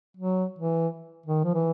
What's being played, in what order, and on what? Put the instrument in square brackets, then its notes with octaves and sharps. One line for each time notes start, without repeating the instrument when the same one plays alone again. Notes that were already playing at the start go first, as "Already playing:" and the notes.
[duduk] F#3
E3
D#3
F3
E3